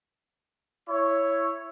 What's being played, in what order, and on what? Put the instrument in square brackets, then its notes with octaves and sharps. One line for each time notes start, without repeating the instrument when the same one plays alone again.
[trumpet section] E4 C#5